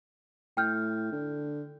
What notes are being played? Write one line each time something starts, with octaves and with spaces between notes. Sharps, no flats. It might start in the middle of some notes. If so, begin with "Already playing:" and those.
A2 G5 F6 G6
D3